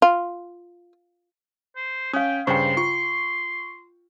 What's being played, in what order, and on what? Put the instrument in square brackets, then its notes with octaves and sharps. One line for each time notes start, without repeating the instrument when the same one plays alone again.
[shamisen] F4
[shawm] C5
[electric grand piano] C#4 [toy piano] F5 D#6 [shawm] G5
[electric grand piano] G2 C#3 C5 [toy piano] G5 C#6 [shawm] C6
[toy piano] F4 [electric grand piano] C#6